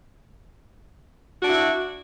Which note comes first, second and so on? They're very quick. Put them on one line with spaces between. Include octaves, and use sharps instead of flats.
F#4 D4 E4